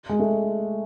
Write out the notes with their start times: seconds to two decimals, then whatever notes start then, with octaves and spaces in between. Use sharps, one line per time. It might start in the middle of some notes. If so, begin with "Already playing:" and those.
0.09 G#3
0.19 A3